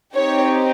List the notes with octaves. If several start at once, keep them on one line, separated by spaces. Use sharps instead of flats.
C4 D#4 G4 C#5